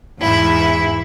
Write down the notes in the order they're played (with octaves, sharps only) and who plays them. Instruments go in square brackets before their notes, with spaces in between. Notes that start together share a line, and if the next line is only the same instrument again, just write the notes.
[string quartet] E2 G#2 E4